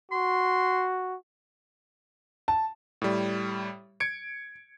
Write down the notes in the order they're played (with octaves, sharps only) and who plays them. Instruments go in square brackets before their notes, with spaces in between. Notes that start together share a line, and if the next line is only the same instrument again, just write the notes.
[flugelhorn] F#4 [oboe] C6
[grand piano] A5
[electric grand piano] A2 G3
G#6 C#7 D7